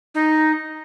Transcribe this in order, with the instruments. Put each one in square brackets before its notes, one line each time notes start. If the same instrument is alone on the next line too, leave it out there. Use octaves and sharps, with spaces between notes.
[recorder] D#4